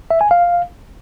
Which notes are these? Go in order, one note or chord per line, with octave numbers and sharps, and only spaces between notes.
E5
G#5
F5